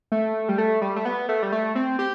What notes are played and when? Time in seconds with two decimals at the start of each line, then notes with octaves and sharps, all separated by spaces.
0.12 A3
0.49 G3
0.58 A3
0.82 G3
0.96 A3
1.05 B3
1.29 A3
1.43 G3
1.52 A3
1.75 C4
1.99 G4